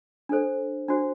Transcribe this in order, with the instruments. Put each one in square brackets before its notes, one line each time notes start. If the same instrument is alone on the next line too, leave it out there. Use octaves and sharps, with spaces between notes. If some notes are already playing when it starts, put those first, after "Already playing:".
[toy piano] D4 A4 C5
D4 F#4 C5